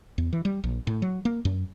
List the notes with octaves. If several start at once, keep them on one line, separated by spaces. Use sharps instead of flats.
E2
E3
G3
A#1
A2
F#3
A#3
F#2